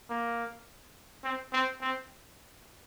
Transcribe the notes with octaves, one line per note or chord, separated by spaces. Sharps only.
A#3
C4
C4
C4